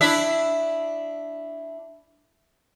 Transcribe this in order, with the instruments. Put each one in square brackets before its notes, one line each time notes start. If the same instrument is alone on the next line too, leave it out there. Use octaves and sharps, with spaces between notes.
[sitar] D4 E4 E5